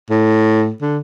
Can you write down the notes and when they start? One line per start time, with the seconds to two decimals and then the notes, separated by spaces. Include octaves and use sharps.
0.10 A2
0.81 D3